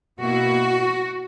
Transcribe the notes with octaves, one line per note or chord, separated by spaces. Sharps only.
B2 A#3 E4 F#4